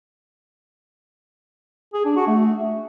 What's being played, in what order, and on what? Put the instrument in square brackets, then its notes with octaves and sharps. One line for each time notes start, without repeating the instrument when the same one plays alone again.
[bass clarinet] G#4
D4
F#4
A3